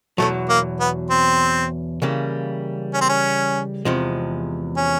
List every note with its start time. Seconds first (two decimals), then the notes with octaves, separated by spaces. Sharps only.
0.18 E2 B2 F#3 A3
0.50 A#3
0.80 B3
1.10 C4
2.02 C#3 E3 G3 A#3
2.93 C#4
3.01 C4
3.09 C#4
3.85 E2 C3 F3 G#3
4.77 C#4